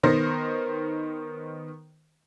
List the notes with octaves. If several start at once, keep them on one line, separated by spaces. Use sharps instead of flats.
D#3 B3 A#4 C5 A#6